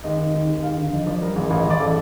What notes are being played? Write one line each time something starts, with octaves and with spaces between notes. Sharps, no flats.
D#2 D#5
D#3
D#2
D#2
D#2 F5
D3
F3 D#5
F3 D5
G3 A#4
A1
A1 F5
D#5
A1 D5
A4